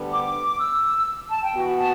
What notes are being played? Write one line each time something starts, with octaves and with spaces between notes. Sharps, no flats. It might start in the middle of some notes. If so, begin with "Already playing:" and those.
Already playing: D2 D3 G3 B3 D4
D6
E6
A5
G5
E3 B3 F#4
A5